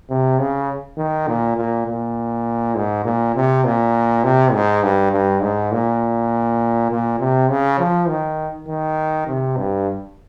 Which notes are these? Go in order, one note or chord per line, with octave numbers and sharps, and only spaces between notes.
C3
C#3
D#3
A#2
A#2
A#2
G#2
A#2
C3
A#2
C3
G#2
G2
G2
G#2
A#2
A#2
C3
C#3
F3
D#3
D#3
C3
G2